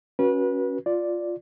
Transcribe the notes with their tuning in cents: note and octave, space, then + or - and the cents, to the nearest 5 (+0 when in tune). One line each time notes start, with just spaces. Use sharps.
C#4 +0 F#4 +0 B4 -30
F4 +0 D5 +0